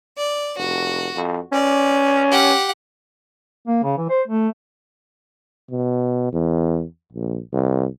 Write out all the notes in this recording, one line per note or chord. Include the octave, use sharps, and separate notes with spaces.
D5
F1 F#4
F2
C#4 D5
G4 F#5
A#3
C#3
E3
C5
A3
B2
E2
A#1
C2